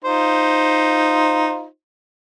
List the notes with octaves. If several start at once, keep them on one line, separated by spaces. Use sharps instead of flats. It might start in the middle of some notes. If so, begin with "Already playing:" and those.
D#4 F4 C5